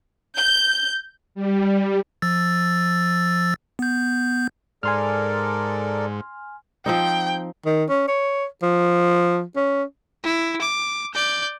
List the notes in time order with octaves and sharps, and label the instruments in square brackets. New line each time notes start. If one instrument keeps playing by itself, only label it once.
[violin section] G6
[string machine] G3
[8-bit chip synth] F3 E6 A6
B3 G6
[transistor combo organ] G#2 [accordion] A4 A#4 D5 [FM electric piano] G#5 C6 F6
[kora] F3 C4 D#4 [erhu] G5
[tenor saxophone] D#3
C#4
C#5
F3
C#4
[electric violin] E4
D6
D5 G6